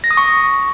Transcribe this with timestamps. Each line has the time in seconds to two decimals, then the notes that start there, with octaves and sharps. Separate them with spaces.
0.04 A#6
0.11 D#6
0.17 C#6